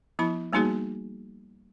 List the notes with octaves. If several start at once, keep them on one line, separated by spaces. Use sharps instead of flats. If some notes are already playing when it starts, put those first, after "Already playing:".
F3 B3 E4 B5
G3 A#3 B3 D#4 F#4 G#4